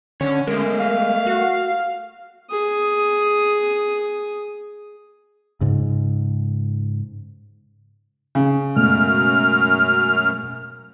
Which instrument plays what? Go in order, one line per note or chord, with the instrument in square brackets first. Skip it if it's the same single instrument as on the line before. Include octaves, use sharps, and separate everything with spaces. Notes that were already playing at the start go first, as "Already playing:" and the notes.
[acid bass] D3 [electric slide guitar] C#4 C#5
[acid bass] G#3 [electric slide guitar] A3 A#4
[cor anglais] F5
[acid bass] F#4
[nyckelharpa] G#4 D#6
[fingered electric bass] G#2 C#3
[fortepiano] C#3
[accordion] F#2 F6 [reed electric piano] B2 G#3 A3